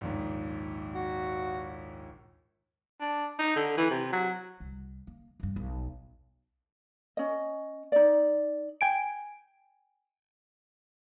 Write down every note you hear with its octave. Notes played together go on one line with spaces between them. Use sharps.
A#1 D#2 G#2
F#4
D4
D#4
D3
E3
C3
F#3
C2
A#3
C2 G2
B1
C#4 D#5
D#4 D5
G5 G#5 D7